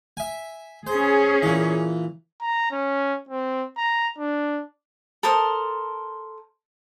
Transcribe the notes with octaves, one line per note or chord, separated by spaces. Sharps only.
E5 G#5
C#4 G#4 C5
A#2 E3
A#5
C#4
C4
A#5
D4
A4 A#4 C5 D#6